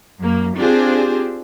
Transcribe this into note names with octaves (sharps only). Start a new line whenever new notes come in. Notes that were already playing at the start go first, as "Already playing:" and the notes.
F#2 A#3
C4 D4 F4 G4 G#4 C5